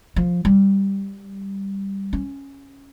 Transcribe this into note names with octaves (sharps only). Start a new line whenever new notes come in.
F3
G3
C#4